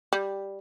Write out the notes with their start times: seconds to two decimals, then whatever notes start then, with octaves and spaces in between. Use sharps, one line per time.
0.13 G3